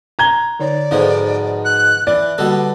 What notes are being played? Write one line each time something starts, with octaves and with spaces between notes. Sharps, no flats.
A#5 G#6 G7
D3 D#4 C#5 D5
G#2 B2 F3 D#4 A4 B4
F#6
E3 D5 F#6
B2 D3 G3 A#3 F#4 A4